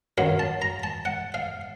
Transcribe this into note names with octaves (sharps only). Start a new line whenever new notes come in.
F#2 D#3 F#3 F5
A5
A#5
A5
F#5
F5